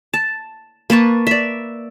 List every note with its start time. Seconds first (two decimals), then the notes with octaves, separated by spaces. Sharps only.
0.14 A5
0.90 A#3 B4 A5 C#6
1.27 D5 E5